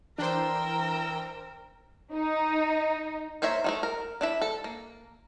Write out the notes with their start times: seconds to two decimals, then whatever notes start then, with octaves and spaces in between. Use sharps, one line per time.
0.18 E3 D4 A#4 C5 G5 E6
2.14 D#4
3.42 A#3 C5 C#5 E5 A#5
3.64 D#3 G3 A3
3.83 A#4
4.21 D4 E4 E5
4.41 A4
4.64 A#3